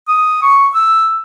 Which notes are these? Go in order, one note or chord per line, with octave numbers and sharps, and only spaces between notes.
D#6
C#6
E6